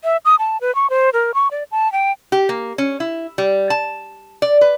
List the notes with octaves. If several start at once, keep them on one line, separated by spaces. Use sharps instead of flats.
E5
D#6
A5
B4
C#6
C5
A#4
C#6
D5
A5
G5
G4
A#3
C#4
E4
G3
A5
D5
B4